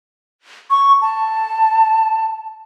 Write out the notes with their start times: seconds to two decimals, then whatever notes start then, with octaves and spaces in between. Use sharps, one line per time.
0.71 C#6
1.02 A5